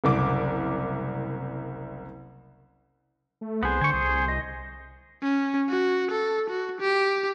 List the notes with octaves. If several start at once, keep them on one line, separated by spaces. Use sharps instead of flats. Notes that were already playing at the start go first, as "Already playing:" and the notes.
F#1 C2 D6
A3
C2 B3 G#4 C5
D3 G#5 C#6
C2 G#4
D#5
C#4
F#4
A4
F#4
G4